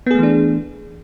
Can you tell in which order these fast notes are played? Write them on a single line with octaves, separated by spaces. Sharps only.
B3 G#4 A3 E3 D4